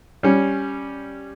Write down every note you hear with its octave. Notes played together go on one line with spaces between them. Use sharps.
G3 C#4